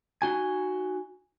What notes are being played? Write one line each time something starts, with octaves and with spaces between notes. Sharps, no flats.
D#4 F#4 G#5